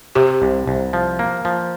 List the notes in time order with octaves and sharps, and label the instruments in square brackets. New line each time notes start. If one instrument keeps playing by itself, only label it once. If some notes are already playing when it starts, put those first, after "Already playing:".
[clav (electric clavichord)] C3 [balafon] G4
[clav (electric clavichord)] C2
C2
F3
A#3
F3